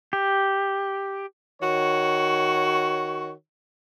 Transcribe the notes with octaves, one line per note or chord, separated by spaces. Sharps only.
G4
D#3 F#4 C#5